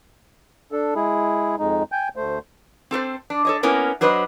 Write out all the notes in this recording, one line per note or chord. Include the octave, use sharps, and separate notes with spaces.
D4 A4
G#3 E4 G#4
F2 G#3 D#4
G5 G#5 G6
D2 A3 C5
C4 A4 A#4 C5
D4
A4 C#5 D#5
A#3 B3 C#4 E4 A#4
F#3 D4 B4 C5 D#5